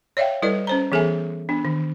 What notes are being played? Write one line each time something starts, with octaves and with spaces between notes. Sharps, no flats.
C#5 D5 E5 F5 G5
G3 E4 A4 B4 D5
C#4 C5 A#5
E3 B3 G#4 A4 E5 G#5
B3 D4
D#3